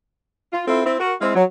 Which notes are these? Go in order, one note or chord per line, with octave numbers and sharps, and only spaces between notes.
F4
C4 E4 F4 A4
C4 E4
F#4 A#4
G#3 C4 E4 F5
F#3